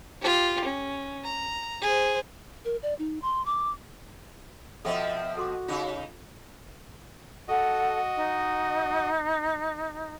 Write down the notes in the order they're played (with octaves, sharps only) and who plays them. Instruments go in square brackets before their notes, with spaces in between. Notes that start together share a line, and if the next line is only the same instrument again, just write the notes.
[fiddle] F4 G4
C#4
A#5
G#4 C5
[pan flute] A#4
D5
D#4
C6
D6
[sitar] B2 F3 C4 [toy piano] A4 D#5 [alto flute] E5
[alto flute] F#4 [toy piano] A4 C6 D6
[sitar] C#3 D#4 [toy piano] F4
[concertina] F#4 D#5 [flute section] A4 F#5
[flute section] D#4